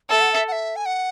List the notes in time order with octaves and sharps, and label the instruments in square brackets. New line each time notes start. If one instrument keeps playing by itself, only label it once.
[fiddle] A4 [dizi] E5
[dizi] F#5
E5
F#5
E5
G#5
F#5